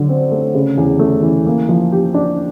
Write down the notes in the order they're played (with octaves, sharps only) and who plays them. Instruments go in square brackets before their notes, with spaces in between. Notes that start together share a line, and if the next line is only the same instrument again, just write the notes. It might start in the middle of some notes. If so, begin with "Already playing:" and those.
Already playing: [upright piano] D3 F#3
C4
A3
C#3
E2
A3
E3
A#3
F3
G4
D4